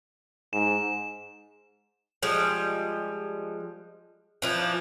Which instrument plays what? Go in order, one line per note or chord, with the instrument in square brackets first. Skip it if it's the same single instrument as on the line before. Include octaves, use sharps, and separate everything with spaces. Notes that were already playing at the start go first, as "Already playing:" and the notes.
[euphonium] G#2 [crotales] E7
[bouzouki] F3 G3 G#3
E3 F3 D4